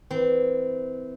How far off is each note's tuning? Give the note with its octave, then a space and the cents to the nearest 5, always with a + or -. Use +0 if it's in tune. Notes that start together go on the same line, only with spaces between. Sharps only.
E3 -20 C4 -25